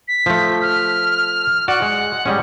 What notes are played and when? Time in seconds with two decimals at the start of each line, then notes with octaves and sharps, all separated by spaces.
0.08 B6
0.26 F3 A3
0.61 F6
1.68 F#4 D5 F#5
1.82 G#3
2.26 G3 G#3 C#4